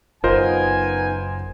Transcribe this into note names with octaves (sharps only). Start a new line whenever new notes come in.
F#1 B3 D#4 F4 A#4 C5 D#5 G#5